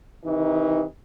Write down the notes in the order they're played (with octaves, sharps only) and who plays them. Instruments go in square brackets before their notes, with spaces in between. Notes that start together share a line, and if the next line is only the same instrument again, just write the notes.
[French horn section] C3 D#3 E3 D#4